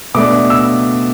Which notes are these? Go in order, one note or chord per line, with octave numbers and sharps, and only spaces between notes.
B2 A3 D4 D6
E6